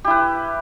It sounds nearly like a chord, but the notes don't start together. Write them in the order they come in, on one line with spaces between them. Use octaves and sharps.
G4 E4 B4